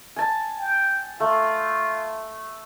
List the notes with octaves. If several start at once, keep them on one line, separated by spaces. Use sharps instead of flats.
G#5 A5
G5
A3 F4